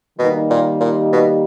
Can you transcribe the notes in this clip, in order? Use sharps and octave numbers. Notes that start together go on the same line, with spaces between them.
B2 D#3 G3 A#3 D#4 G4
A#2
A#2
B2